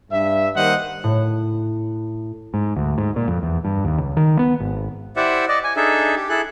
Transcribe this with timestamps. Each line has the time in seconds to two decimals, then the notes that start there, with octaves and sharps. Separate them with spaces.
0.11 G2 E5
0.56 D#3 G3 A#3 C5 D#5 F#5
1.04 A2
2.54 G#2
2.77 D2
2.98 G#2
3.16 A#2
3.28 F2
3.43 E2
3.65 G2
3.85 D#2
3.98 C#2
4.17 D#3
4.39 B3
4.60 G#1
5.16 E4 G4 C5 D5 E5 F#5
5.48 D5 D#5
5.64 G#5
5.76 D4 D#4 G#4 A4 E5
6.16 G4
6.29 E4 G#4 A4 F#6